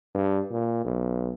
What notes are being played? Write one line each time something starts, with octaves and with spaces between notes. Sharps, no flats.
G2
A#2
B1